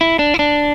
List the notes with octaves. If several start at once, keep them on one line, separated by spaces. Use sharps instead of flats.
E4
D4
E4
D4